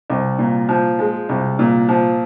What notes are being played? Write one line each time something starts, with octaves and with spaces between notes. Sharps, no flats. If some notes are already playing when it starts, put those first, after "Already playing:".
C2
A#2
F3
G#3
C2
A#2
F3